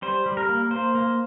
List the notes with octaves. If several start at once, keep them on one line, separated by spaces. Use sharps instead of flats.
G3 C5
G3
A#4
A#3
A#3 C5
A#3